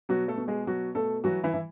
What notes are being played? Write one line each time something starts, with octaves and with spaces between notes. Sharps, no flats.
B2 F#3 F#4
A3 A4
B2
G#3 G#4
B2 F#3 F#4
B2 A3 A4
E3 F#3 F#4
E3 E4
E3